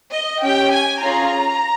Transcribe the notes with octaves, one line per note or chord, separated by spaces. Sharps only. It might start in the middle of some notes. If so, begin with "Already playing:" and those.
D#5
C#4 G4 G5
G#5
C#4 F4 G#4 A#5